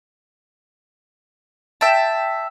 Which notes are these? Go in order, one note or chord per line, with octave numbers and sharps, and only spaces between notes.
E5 G5 A5